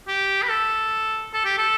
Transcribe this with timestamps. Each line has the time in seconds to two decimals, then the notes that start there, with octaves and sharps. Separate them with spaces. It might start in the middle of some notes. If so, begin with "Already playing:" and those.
0.08 G4
0.43 B4
0.49 A4
1.33 A4
1.45 G4
1.58 A4